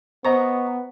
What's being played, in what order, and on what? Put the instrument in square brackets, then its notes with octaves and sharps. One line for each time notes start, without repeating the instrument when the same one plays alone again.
[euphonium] B3 [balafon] C5 [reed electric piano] D#5 A#5 C#6